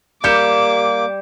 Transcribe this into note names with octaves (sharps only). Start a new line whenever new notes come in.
G3 A#3 G4 D6 G6 C#7 E7